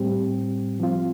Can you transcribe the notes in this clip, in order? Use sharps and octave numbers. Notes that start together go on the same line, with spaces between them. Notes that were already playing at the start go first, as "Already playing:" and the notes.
Already playing: A2 G3 C4 G4
F3 C4 F4